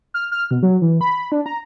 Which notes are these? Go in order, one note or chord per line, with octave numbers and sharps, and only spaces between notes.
F6
F6
B2
F#3
E3
B5
D4
A#5